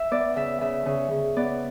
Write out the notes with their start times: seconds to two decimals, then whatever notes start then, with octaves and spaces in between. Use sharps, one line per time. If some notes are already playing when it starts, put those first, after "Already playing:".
Already playing: E5
0.11 B3 D5
0.36 C#3 E5
0.61 C#3 E5
0.86 C#3
1.11 C#3
1.36 B3 D5